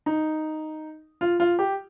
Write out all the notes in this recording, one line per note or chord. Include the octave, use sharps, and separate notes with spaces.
D#4
F4
F4
G4